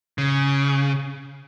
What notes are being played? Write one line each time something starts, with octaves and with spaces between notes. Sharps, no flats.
C#3